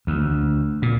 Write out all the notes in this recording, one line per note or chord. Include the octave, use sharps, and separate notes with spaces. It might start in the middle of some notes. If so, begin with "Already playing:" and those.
D2
A#2